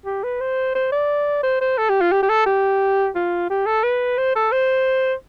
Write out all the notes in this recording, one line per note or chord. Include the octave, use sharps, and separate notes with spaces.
G4
B4
C5
C5
D5
C5
C5
A4
G4
F4
G4
G4
A4
G4
F4
G4
A4
B4
C5
A4
C5